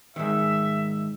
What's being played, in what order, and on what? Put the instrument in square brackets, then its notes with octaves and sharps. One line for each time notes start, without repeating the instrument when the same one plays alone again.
[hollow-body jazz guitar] G#2 D#3 [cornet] E5